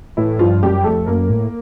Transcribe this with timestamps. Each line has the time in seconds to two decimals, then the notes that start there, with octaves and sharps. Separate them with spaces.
0.17 A2 E3 E4
0.39 G2 F3 F4
0.62 F#2 G3 G4
0.84 F2 A3 A4
1.06 F#2 A#3 A#4
1.30 A2